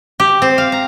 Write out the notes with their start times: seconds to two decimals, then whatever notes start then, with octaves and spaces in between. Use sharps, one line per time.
0.20 G4
0.42 C4
0.58 F5
0.72 A#5